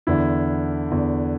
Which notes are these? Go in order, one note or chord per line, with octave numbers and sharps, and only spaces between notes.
E2 D3 E4
E2 D3